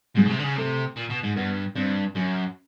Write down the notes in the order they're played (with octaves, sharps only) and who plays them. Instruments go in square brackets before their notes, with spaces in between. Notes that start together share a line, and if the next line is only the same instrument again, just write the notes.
[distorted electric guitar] G#2 [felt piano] G#3
[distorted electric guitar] B2
C3
D3
C#3
[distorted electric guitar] C3 [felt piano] A3
[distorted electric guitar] A#2
B2
G#2
[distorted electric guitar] G2 [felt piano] B3
[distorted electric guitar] G2 [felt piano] C4
[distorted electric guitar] F#2 [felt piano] C#4